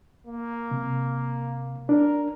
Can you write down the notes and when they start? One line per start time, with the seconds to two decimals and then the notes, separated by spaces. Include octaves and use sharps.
0.27 A#3
0.71 C3
1.89 D4 A#4